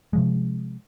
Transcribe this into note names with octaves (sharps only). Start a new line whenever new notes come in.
C3 F3 G#3